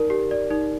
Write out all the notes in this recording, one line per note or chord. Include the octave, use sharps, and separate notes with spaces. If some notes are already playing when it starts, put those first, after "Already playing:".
Already playing: D#4 A#4 D5
G4
D5
D#4